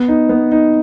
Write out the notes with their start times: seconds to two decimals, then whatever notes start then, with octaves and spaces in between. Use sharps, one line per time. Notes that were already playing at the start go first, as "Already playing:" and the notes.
Already playing: B3
0.08 D#4
0.29 B3
0.52 D#4